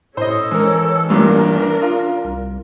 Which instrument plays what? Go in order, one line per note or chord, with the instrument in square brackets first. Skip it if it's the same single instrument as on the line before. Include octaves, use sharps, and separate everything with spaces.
[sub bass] A2 [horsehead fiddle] A4 C#5 [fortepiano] C5 D#5
[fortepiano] G#2 A#4 [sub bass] E3
[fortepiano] A1 G2 A#2 [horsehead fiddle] D4 A#4
[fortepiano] F4
[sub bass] C2